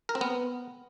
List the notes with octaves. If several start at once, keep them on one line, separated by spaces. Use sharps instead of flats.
A#4
C4
B3